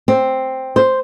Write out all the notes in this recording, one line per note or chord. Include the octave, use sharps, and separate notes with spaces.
C4
C5